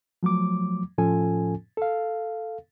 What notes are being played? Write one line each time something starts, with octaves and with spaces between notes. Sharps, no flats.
F3 F#3 A3 D6
A2 F3 C#4 F4 A4 G#5
A4 F5